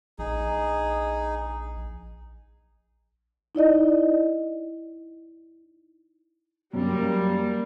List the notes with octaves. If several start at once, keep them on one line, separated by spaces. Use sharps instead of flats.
A#1 D#4 G#4
D#4 E4 D5 D#5
F#2 G3 A#3